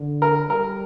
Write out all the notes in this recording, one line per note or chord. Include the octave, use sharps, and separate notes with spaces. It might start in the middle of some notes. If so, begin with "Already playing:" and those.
Already playing: D3
A#4
G3 A#4